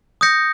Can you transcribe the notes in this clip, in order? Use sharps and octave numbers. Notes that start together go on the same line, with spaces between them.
D#6 G6 A#6 C#7